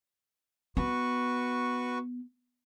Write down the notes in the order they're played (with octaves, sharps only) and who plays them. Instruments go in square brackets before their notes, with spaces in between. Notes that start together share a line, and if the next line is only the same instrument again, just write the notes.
[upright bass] B3 [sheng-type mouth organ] F#4 B4 C#6